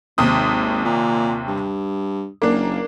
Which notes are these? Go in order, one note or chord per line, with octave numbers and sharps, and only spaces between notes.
G#1 D#2 C3 D#6
A#2
G2
F#1 A#3 D4